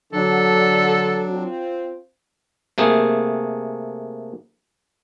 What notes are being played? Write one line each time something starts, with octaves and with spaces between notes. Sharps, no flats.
D3 F#3 D4 A4
C4 F4
C3 A3 A#3 G#4